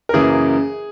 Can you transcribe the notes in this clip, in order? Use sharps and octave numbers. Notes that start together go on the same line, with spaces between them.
A#4
F#2 C#3 E3 A#3 G#4